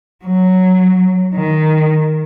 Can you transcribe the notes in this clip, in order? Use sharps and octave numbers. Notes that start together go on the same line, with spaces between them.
F#3
D#3